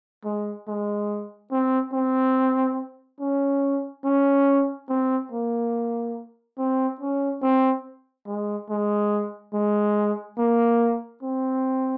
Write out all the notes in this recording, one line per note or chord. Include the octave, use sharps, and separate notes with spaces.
G#3
G#3
C4
C4
C#4
C#4
C4
A#3
C4
C#4
C4
G#3
G#3
G#3
A#3
C4